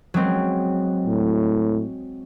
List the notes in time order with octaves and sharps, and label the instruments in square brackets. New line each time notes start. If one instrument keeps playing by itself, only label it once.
[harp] F#3 G#3 C4
[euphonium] A2